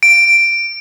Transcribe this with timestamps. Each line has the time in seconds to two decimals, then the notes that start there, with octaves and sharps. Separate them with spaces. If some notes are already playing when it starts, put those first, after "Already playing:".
0.03 D7